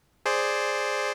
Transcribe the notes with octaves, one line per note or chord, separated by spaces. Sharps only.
G#4 C5 D5